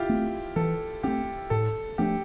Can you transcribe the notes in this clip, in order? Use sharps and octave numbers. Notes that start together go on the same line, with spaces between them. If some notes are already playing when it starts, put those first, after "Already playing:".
Already playing: E4 F4 G4
A3 C4
E3 A4
A3 C4 G4
A2 A4
F3 A3 D4 G4